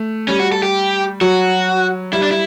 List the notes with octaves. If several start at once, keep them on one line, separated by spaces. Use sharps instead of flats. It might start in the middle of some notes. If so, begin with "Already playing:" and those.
Already playing: A3
G3 C#4
F#4
A4
G4
F#3 F#4
G3 E4
D4
E4